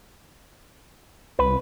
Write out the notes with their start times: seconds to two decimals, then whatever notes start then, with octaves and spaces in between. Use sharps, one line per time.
1.39 C2 B4